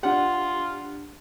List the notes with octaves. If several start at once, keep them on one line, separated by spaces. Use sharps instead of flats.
D4 F4 G4 F#5